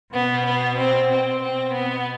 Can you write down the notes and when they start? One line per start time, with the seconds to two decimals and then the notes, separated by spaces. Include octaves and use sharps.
0.13 B2 B3
0.45 B3
0.77 C4
1.09 C4
1.40 B2 C4
1.72 B3